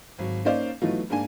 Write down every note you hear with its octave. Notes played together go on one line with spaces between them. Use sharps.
G#1 F#3
A#3 C#4 D#4 C5 D5 F5
E3 F#3 A3 B3 D#4 F4
G#2 A#3 D4 G#5